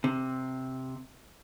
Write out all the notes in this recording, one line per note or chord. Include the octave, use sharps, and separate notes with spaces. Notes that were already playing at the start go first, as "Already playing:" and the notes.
C3